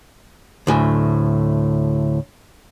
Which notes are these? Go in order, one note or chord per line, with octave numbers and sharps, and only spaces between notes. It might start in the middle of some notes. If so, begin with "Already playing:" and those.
D2 A2 G#5